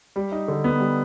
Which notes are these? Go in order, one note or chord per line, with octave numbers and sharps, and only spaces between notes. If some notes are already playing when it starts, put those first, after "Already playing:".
G3
D#4
D3
B3
G3